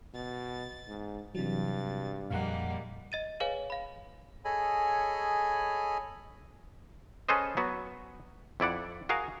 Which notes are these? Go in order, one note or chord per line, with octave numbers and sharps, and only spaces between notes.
B2 A6
G#2
G2 C3 E3 F#3 A6
F2 A#2 G3 G#3 A#3 F5 F#5
D#5 A6 D#7
G#4 B4 C#5 F5 G#5
F5 B5
G#4 A4 C#5 D#5 G#5 B5
C#4 G#4 A4 B4 C5 D#5
F#3 B3 F#4
F2 E4 D5 F#5
F#4 G#4 A#4 F5